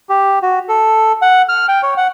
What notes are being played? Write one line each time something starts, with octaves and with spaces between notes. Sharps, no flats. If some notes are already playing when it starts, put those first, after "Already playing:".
G4
F#4
A4
F#5
F6
G5
C#5
F#5